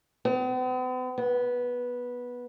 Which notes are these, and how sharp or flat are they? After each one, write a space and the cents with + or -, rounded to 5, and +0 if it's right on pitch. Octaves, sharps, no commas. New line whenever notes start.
B3 +45
B3 -10